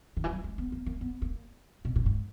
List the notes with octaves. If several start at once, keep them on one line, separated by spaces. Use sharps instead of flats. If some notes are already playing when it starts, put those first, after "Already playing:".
D#3
E3
F#3
G#3
B3
A#3
A#3
B3
A#3
B2
A#2
G#2